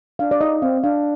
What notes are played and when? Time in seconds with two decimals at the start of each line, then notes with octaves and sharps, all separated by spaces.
0.19 D4 F5
0.31 D5
0.41 D#4 D#5
0.62 C4 F5
0.84 D4 F5